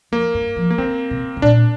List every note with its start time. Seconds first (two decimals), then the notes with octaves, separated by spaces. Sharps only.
0.12 F2 A#3
0.34 G2
0.56 F3
0.70 A#3
0.78 D3 C4
1.11 C3
1.37 C3
1.42 A#2 D4